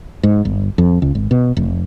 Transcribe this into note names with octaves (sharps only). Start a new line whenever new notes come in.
G#2
G1
F2
C#2
G#1
B2
F1